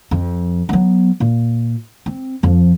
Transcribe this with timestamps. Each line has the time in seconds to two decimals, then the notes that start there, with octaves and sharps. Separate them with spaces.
0.11 F2
0.69 F#3 B3
1.20 A#2
2.06 C4
2.43 F2 F3